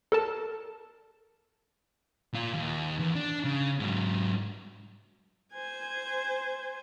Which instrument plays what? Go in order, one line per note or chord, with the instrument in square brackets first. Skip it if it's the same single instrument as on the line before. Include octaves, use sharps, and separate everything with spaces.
[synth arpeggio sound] A4 A#4 A5
[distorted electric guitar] A#2 F4
D#2
E2
D4
C#3
G#2 F#3
[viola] C5 G#5